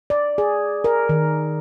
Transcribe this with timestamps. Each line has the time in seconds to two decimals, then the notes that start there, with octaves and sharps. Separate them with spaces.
0.10 D5
0.38 G#4
0.84 A#4
1.09 D#3